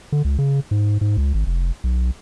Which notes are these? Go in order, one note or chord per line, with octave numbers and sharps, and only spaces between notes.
D3
C#2
C#3
G#2
G#2
C#2
G#1
F1
B1